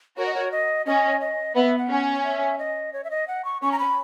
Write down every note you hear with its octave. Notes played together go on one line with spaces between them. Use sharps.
F#4 A#4 C#5
D#5
C#5
D#5
C#4 D#5
D#5
B3 E5
F#5
C#4
E5
D#5
C#5
E5
D#5
F#5
C#6
C#4 C#6
A#5
B5